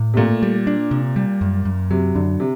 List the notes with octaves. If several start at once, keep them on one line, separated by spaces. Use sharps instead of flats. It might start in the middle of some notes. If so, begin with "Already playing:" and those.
Already playing: A2
C3
A#2 A3
G3
D4
C3
G3
F#2
F#2
C3 F#3
F#2 D3
C3